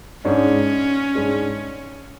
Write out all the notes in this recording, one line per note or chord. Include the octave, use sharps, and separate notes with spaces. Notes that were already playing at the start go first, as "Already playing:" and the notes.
G#2 G#3 C#4 D4 G#4 C#5
G#2 G#3 D4 G#4 C#5